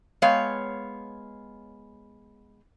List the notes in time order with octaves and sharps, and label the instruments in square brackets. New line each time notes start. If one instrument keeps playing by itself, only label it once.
[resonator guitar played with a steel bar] G#3 B3 C#5 F5 G5